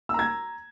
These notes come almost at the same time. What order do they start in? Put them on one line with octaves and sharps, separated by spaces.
E6 A#5 G#6